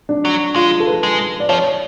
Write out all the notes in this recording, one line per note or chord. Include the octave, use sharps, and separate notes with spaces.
D4
F#3
G#3 F4
A4
B4
G#3
B4
D5
F3 C#5